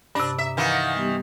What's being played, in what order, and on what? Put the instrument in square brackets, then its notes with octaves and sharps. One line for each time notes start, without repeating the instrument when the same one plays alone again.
[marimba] G2 C3 [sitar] D4
[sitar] E5 [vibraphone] A#5
[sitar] D#3 E3 [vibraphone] F5 F#5
[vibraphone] G3 B3 G4